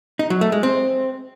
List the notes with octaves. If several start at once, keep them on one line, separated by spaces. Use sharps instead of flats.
D#4
F#3
A3
G#3
C4